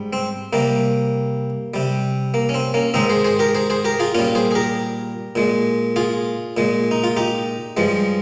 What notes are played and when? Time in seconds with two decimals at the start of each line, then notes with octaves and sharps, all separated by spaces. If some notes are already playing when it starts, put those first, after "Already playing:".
Already playing: G#2 G3
0.13 C4
0.53 C3 G3 A#3
1.74 C3 G3
2.34 A#3
2.49 C#4
2.54 C4
2.74 A#3 C#4
2.94 G#2 D#3 G#3 C4 D#4
3.09 G#4 C5
3.24 G#4 C5
3.39 G4 A#4
3.55 G#4 C5
3.70 G#4 C5
3.85 G4 A#4
3.99 F4 G#4
4.15 A#2 G3 C#4 F4
4.35 G#4 C5
4.51 G#4
4.55 G4 A#4
5.35 A#2 G#3
5.96 F4 G#4
6.57 A#2 G#3
6.91 D#4
7.04 F4
7.17 D#4 G4
7.77 G2 F3 G#3